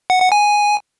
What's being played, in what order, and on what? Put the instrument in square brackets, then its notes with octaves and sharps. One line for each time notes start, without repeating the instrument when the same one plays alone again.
[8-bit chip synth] F#5
F#5
G#5